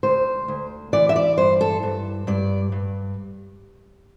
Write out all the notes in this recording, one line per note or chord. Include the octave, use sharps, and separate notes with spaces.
D2 C5
D2
E3 D5
E5
D5
G2 C5
A4
G2
G2 D5
G2